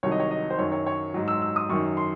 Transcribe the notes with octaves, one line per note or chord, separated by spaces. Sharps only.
C2 C3 D#3 F#3 C#5
D#5
C#5
D#5
C5
F#2 D#3 F#3 C#5
C#5
C#5
G#2 F#3
E6
E6
D#6
F#2 D#3 F#3 C#6
C6